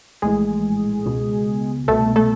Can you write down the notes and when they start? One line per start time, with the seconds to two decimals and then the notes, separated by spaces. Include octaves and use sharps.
0.22 A#1 A2 E3 G#3 G#4
1.06 C#2 B2
1.88 C2 B2 A3 A4
2.16 A3 A4